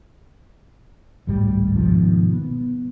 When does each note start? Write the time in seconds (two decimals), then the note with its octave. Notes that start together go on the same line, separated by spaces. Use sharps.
1.27 G#1 C#2 A2 G3
1.76 G#2 B2 D#3 F3
2.33 B3